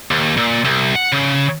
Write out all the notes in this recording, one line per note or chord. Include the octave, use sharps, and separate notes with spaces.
D#2
A#2
C2
F#5
C#3